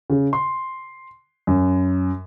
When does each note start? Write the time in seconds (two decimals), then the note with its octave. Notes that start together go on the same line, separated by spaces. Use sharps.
0.10 C#3
0.33 C6
1.47 F#2